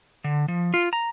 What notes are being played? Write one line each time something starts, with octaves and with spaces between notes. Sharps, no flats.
D3
F3
F4
A#5